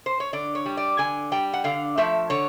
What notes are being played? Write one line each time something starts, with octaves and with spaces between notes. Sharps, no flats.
C5
C#5
D3 D5
C#5
G3
D5
D3 G#5
G3 G5
F#5
D3 F5
F3 A3 E5
D3 C#5